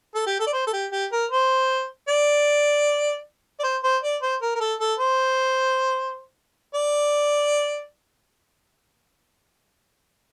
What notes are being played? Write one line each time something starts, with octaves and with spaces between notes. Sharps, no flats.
A4
G4
A4
D5
C5
A4
G4
G4
A#4
C5
D5
D5
C5
C5
D5
C5
A#4
A#4
A4
A4
C5
D5